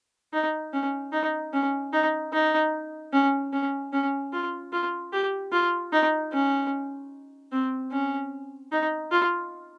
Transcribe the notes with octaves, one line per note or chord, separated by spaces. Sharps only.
D#4
C#4
D#4
C#4
D#4
D#4
C#4
C#4
C#4
F4
F4
G4
F4
D#4
C#4
C4
C#4
D#4
F4